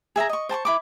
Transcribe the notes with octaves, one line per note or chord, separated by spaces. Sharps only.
G#4 E5 G#5 A#5
D#5 C#6
C5 A5 C6 C#6
E4 B5 D6